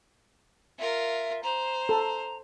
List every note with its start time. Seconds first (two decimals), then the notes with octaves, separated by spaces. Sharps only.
0.78 F4 A#4 E5
1.43 C5 A#5
1.89 A4